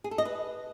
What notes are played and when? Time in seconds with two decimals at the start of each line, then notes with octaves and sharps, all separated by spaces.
0.04 G#4
0.11 A4
0.18 D#5
0.25 B4